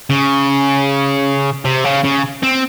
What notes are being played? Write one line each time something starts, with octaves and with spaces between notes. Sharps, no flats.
C#3
C3
C#3
C#3
C4